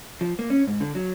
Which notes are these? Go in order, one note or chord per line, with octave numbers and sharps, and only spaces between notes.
F3
A#3
C#4
G#2
D3
F#3